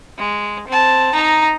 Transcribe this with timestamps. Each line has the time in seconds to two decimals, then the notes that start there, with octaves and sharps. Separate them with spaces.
0.18 G#3
0.68 C4 A5
1.14 D#4 A#5